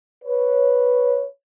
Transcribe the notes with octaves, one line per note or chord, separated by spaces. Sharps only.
B4 C#5